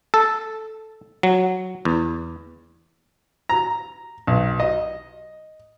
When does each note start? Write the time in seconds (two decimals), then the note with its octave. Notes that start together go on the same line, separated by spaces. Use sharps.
0.14 A4
1.23 F#3
1.85 E2
3.49 A#5
4.27 B1
4.60 D#5